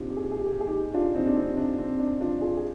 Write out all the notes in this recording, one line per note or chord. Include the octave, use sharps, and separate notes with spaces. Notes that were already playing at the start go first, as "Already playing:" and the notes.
Already playing: A#2 C4 D4 D#4 F4 G4
G4
G#4
G4
G#4
G4
G#4
G4
G#4
D#4 G4
D4 F4
C4 D#4
D4
C4 D#4
D4
C4
D4
D4 F4
F4 G#4
G#4